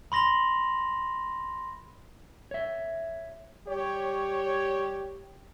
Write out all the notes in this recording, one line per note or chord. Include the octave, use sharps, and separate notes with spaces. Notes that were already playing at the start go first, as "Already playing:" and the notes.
B5 C6 A#6 F7 F#7
C#5 E5
G3 G4 C#5